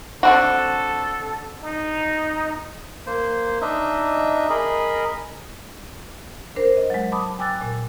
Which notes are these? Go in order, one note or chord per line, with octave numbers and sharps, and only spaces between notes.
D3 C4 F#4 A4
D#4
A#3 C5
D4 D#4 D#5 E5
G#4 A#4 D#5 B5
D4 A#4 C5
D#5
F#3 G#3
A5 B5 D6 D#6
G5 G#5 D6 E6 F#6 A6
A#2